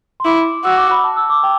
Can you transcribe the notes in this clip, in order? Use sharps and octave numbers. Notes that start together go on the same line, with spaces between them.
C6
E4 D6
F#4 E6
D6
B5
A5
E6
D6
G5